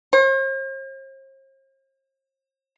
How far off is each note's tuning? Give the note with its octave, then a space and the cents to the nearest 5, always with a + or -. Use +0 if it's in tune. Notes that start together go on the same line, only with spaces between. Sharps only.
C5 +45